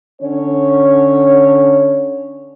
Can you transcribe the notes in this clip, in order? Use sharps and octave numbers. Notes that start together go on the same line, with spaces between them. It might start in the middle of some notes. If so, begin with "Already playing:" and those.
D3 C#4 C#5